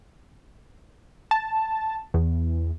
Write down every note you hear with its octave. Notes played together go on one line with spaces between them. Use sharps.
A5
E2